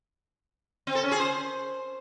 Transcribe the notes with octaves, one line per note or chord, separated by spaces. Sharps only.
C4
A4
C#4
G#4
C5